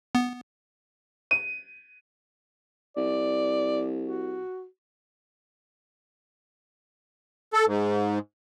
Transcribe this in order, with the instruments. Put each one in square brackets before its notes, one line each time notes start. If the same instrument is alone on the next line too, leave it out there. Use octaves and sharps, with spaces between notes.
[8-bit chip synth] B3
[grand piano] D#7
[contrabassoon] C2 [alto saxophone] D5
[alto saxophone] F#4
[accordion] A4
G#2